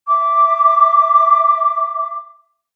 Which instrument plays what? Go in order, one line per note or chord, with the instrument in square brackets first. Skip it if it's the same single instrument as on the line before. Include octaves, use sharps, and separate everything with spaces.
[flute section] E5 D6